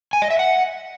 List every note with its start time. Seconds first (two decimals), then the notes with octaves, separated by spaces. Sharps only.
0.13 G#5
0.22 D#5
0.30 E5
0.39 F#5